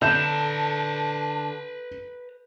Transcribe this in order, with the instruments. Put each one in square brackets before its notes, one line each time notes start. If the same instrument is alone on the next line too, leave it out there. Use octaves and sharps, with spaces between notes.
[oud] D3 [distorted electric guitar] B4 A#5 [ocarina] A5 [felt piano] G6 E7